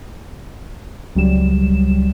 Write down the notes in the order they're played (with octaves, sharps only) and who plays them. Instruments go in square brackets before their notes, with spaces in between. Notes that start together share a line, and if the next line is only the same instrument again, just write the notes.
[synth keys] C#2 F#3 G3 E7